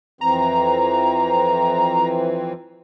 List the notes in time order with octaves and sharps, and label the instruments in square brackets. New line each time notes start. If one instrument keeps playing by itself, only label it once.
[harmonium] F2 E3 C4 [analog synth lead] A#5